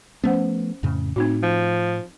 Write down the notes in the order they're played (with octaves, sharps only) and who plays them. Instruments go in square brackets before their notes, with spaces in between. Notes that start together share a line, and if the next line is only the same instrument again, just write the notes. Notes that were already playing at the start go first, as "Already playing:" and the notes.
[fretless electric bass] F3 A3 B3 [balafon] C#4 C5 F#5
[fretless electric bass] F2 A2 C#3
[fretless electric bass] A2 [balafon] C4 D#4 F#4
[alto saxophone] F3